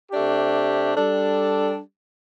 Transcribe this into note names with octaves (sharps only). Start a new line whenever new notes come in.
C3 A3 D4 G4
G3 D4 A4